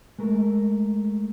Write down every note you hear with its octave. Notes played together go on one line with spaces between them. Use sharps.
G#3 A3 A#4